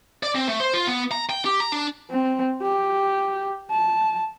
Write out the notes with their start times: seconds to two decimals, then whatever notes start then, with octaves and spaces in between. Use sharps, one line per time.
0.23 D5
0.35 C4
0.49 A3
0.60 C5
0.74 F4
0.87 B3
1.11 A#5
1.30 G5
1.45 G4
1.60 A#5
1.72 D4
2.11 C4
2.62 G4
3.71 A5